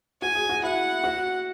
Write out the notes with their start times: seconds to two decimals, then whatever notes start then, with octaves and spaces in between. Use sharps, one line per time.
0.22 F#4 G#5
0.35 G#4
0.49 F#4
0.63 E4 F#5
1.04 F#4